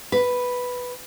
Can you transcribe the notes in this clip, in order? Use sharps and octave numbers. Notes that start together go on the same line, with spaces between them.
B4